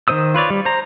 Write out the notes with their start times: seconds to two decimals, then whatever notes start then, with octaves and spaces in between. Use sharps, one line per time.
0.08 D#3 D4 C5 D#6 E6
0.34 F4 B4 C#5 D5
0.50 G3
0.65 C5 A#5